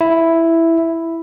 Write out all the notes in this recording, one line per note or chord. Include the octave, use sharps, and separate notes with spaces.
E4